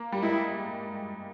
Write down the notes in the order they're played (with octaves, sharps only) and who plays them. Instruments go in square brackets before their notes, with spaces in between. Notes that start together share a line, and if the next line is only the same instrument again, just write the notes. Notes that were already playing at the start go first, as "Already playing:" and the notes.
Already playing: [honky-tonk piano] A#3
G3
[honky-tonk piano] G#3 [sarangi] E4